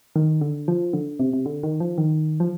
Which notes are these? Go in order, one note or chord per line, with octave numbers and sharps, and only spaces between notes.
D#3
D3
F3
D3
C3
C3
D3
D#3
F3
D#3
F3